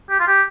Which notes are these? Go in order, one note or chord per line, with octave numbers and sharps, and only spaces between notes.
G4
F4
G4